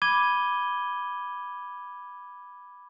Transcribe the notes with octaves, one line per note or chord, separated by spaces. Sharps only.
B5 D6 G#6 D#7 G7